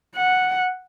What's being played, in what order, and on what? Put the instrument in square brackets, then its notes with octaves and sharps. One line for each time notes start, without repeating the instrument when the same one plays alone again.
[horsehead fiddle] F#5